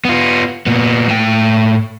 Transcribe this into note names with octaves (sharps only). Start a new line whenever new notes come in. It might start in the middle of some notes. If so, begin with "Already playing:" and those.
B3 F4
A#2 B3
A2 G5